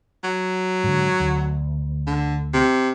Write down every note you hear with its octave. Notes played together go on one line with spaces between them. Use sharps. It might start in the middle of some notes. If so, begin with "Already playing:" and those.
F#3
G#2 D3
D2
D3
C3